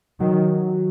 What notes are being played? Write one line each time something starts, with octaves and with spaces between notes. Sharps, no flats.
D#3 F#3